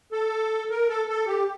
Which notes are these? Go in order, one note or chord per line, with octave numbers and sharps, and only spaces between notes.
A4
A#4
A4
A4
G4